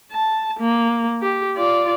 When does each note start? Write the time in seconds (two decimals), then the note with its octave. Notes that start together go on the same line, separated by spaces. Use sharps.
0.11 A5
0.60 A#3
1.22 G4
1.57 F4 D5